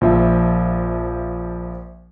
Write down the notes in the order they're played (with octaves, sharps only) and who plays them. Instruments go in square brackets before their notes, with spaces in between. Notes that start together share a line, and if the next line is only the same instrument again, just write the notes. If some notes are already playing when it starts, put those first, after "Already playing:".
[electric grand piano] A#1 F3 E5